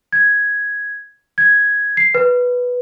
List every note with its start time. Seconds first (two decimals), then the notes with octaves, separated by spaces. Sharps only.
0.12 G#6
1.38 G#6
1.97 C7
2.15 B4